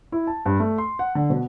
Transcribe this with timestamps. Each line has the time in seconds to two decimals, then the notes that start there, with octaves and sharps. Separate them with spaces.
0.12 E4
0.27 A5
0.46 G2
0.60 A3
0.78 C6
0.99 F#5
1.15 D3
1.30 B2